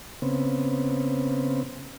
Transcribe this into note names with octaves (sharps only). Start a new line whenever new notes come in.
C#3 B3 C4